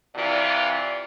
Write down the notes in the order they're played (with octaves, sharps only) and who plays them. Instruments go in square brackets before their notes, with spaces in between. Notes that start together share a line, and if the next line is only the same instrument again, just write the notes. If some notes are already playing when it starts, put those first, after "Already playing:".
[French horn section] C3 E3 F4 D5